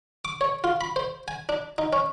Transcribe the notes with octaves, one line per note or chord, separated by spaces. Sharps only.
D6
C#5
F4
B5
C5
G#5
D4
D#4
C#4